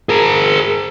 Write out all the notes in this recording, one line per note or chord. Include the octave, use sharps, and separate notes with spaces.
G#4 A#4